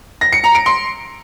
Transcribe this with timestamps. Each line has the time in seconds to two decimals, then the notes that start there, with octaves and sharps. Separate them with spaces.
0.21 A#6
0.32 C#7
0.44 A#5
0.55 D7
0.66 C6